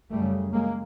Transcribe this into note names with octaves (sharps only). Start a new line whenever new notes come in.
F#2 C#3 G3 A3
G#3 A#3